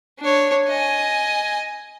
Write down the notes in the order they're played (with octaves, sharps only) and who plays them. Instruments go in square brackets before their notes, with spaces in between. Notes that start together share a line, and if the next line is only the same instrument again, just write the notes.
[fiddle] D4 C#5
D#5 G#5